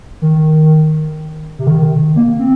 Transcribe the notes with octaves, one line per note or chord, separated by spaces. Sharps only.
D#3
C3
D#3
A#3
C4